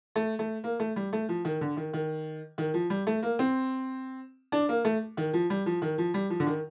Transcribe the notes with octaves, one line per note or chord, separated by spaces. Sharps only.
A3
A3
A#3
A3
G3
A3
F3
D#3
D3
D#3
D#3
D#3
F3
G3
A3
A#3
C4
D4
A#3
A3
D#3
F3
G3
F3
D#3
F3
G3
F3
D3
D#3